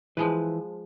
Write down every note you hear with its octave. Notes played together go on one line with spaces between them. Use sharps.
E3 F3 G#3 B4